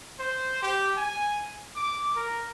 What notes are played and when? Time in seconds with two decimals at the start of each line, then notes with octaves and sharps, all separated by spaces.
0.19 C5
0.63 G4
0.97 G#5
1.76 D6
2.16 A#4